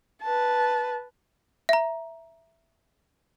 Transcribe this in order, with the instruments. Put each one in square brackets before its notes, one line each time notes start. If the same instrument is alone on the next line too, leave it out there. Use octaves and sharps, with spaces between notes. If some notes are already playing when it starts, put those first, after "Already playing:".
[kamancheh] B4 A5
[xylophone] E5 A#5